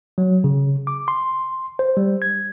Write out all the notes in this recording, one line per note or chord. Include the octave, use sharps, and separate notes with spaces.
F#3
C#3
D6
C6
C5
G3
G#6